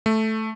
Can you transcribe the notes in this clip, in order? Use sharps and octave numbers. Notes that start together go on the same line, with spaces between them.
A3